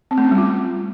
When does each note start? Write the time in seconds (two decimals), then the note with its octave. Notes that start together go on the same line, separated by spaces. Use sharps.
0.11 C4
0.18 A3
0.24 C#4
0.31 G3
0.38 F4